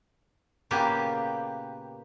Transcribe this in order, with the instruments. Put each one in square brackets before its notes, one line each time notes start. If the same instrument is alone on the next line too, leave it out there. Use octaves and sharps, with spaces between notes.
[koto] A#2 C#3 A#3 B3 G4 G#5